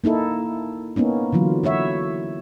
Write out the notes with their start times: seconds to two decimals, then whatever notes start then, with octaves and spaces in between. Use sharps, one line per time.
0.04 A#3 D#4 E4 A4
0.96 A#3 B3 C#4 D#4
1.32 D3 E3 F#3 F4
1.63 E4 F#4 C#5 E5